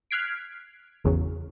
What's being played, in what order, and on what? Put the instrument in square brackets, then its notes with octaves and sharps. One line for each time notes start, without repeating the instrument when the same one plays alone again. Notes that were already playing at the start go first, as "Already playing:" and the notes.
[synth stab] F6 F#6 G#6 B6 C7 D7
G#1 E2 C#3 F#3